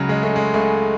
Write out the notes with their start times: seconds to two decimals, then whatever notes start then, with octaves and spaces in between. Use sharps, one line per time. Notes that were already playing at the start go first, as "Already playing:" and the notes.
Already playing: C#2 C#3 F#3
0.09 G#3
0.23 C#3 A3
0.36 G#3
0.54 C#2 A3